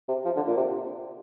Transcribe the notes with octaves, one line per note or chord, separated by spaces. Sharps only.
C3
F3
D3
A#2
C3